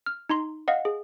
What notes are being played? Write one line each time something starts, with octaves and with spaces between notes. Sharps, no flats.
F6
D#4 A#5 C6
D#5 F5 F#5
G#4